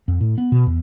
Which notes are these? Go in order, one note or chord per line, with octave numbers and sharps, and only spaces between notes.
F2
A2
B3
B2
E2